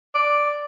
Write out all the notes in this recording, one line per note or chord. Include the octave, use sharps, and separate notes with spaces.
D5